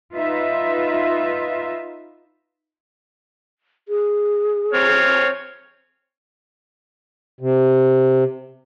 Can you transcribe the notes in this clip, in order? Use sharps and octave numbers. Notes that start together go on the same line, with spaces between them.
D#4 F4 B4 E5
G#4
C4 C#5 F6
C3